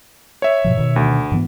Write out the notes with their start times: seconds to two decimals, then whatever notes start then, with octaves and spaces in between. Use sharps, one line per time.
0.42 C#5 E5
0.64 G#2 B2 F3
0.77 B2 D#3
0.96 D2
1.32 G#2 E3 B3